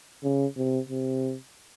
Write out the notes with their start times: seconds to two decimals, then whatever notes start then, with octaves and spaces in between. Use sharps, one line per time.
0.24 C#3
0.57 C3
0.89 C3